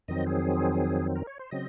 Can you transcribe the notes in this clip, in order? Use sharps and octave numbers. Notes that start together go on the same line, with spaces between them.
F2 D#3 F#3 C4 D#5
G#4
A#4
C#5
C5
C#3 F#3 C4 D#5